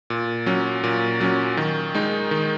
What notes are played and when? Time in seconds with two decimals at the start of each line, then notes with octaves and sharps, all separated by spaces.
0.10 A#2
0.46 F#3 C#4
0.84 A#2
1.20 F#3 C#4
1.57 D#3
1.95 G#3 D#4
2.31 D#3